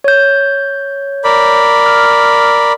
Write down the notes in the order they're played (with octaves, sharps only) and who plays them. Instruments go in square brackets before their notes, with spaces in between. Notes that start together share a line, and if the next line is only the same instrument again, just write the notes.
[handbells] C#5 G6
[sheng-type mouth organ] A#4 D5 B5
[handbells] F6